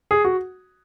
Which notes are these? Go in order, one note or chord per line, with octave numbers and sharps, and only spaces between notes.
G#4
F#4